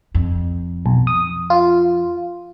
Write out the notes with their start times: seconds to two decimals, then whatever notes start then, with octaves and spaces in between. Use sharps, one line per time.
0.14 F2
0.86 B1
1.07 D#6
1.50 F4